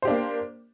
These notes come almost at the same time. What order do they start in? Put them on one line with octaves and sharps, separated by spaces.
C5 G4 D4 A#3